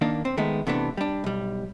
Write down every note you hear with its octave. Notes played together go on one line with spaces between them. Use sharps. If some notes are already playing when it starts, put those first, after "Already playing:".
D#3 A#3 D4
C4
D#3 G#3 A3 B3
C3 E3 A3 B3 D4
G3 D4
B1 G3